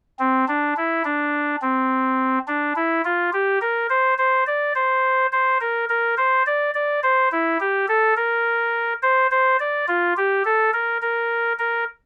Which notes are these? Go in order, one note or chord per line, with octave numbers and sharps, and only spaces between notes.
C4
D4
E4
D4
C4
D4
E4
F4
G4
A#4
C5
C5
D5
C5
C5
A#4
A#4
C5
D5
D5
C5
E4
G4
A4
A#4
C5
C5
D5
F4
G4
A4
A#4
A#4
A#4